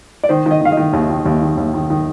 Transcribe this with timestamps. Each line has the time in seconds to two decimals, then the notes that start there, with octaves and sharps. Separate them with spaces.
0.23 D5
0.29 D#3 C5
0.46 D#3
0.51 D#5
0.61 D#3 F5
0.72 D#5
0.77 D#3
0.93 D#2
1.10 D#3
1.26 D#2
1.41 D#3
1.57 D#2
1.74 D#3
1.90 D#3